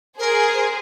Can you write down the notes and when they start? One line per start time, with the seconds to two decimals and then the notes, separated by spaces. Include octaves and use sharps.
0.19 G#4 A#4 C5